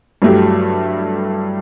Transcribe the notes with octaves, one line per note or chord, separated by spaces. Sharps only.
G2 F#3 A3 E4 G4